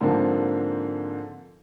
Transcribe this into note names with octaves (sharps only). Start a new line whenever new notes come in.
G#2 D3 F3 A#3 C4